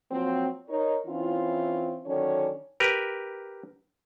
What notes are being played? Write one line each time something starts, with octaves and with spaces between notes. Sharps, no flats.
F3 F#3 A#3 C4
D#4 A#4 C#5
E3 C4 C#4 E4 F4
D3 D#3 F#3 C#4 D4 C#5
G4 A#4 B4